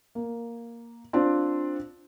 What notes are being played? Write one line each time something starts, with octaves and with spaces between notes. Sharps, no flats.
A#3
C4 D4 F4 C5